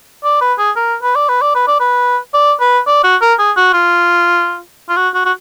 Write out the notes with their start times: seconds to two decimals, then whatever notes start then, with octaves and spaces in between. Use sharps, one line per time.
0.24 D5
0.41 B4
0.59 G#4
0.76 A#4
1.03 B4
1.16 D5
1.29 B4
1.42 D5
1.55 B4
1.68 D5
1.80 B4
2.34 D5
2.60 B4
2.87 D5
3.04 F#4
3.22 A#4
3.39 G#4
3.56 F#4
3.73 F4
4.89 F4
4.97 F#4
5.14 F#4
5.25 F#4